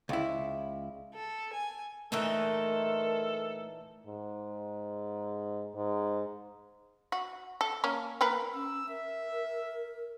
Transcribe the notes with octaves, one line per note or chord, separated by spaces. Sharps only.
C#2 E4
A4
G#5
A#2 E3 A3 D#4 A4 A#4 E5
G#2
G#2
F#4
A4
A#3 C#4 A#4
A#3 A#4 B4
C#4 E6
A#4 E5